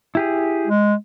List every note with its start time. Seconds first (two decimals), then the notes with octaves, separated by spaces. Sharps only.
0.15 E4 G4 G#4
0.67 G#3